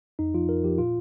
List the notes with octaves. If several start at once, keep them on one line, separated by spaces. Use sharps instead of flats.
F2 D#4
F3 F4
F2 A#4
F3 G4
A#2 F4